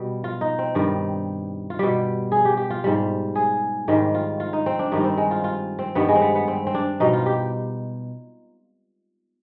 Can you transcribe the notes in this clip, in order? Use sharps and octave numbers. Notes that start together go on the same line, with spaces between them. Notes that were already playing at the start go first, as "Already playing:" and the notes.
Already playing: B2 G3
F4
D#4
C4
G2 D#3 G3
F4
B2 G3 G4
G#4
G4
G4
F4
G#2 G3
G#4
G#2 D#3 G3
F4
F4
D#4
C4
D4
G2 D#3 G3 D#4
C4
G#3
F4
F4
C4
G2 D#3 G3 B3
G#3
C4
B3
B3
C4
C4
D4
B2 G3 D#4
F4
G4